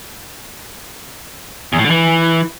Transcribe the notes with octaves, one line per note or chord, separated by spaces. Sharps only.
E2
A2
D3
E3